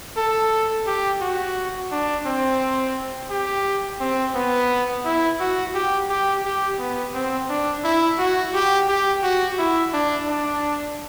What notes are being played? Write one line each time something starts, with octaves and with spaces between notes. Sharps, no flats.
A4
G4
F#4
D4
C4
G4
C4
B3
E4
F#4
G4
G4
G4
B3
C4
D4
E4
F#4
G4
G4
F#4
E4
D4
D4